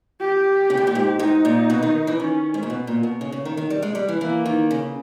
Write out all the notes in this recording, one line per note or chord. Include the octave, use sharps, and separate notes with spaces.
G4
C#3
B2
A#2
G#2
G#2 D#4
A#2
B2
D#3
E3
D#3 C#4
G#2
A#2
B2
A#2
B2
C#3
C#3
D#3
D#3
G3
G#3
G3
E3
E3 A#3
D#3
C#3